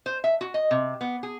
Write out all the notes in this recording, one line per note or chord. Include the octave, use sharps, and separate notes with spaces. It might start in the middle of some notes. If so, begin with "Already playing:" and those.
C5
E5
F#4
D#5
C3
B3
G#4